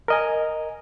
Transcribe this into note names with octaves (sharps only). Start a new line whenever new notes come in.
A#4 D#5 G#5